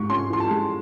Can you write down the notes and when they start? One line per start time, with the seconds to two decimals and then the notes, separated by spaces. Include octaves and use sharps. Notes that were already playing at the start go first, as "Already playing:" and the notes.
Already playing: G#2 C#6
0.10 C#4 C6
0.30 E3 C6
0.40 A5
0.51 G#3